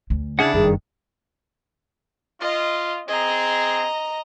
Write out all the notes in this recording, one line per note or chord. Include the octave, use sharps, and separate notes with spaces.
D2
C#3 D4 E4 G#4 F#5
F#1 G2 D#3 G#4
F4 D#5
C4 G#4 D#5 A#5